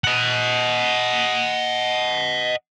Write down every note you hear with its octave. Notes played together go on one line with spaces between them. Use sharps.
D#5 F#5